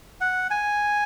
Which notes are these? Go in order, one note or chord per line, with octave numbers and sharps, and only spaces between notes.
F#5
G#5